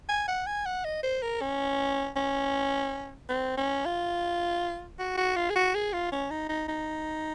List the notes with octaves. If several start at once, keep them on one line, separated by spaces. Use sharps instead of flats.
G#5
F#5
G#5
F#5
D#5
C5
A#4
C#4
C#4
C4
C#4
F4
F#4
F#4
F4
G#4
F#4
G#4
F4
C#4
D#4
D#4
D#4